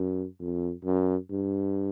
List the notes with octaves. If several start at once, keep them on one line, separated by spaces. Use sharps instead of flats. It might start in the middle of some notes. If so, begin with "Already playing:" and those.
Already playing: F#2
F2
F#2
G2